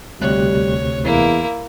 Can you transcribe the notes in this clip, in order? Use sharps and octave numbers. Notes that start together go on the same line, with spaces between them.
D2 C3 G3 C#5 F#6
E2 A#3 E4